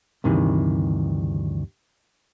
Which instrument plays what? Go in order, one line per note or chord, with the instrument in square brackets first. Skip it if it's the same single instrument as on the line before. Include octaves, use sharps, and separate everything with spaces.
[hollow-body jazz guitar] D2 G2 C3 D#3 E3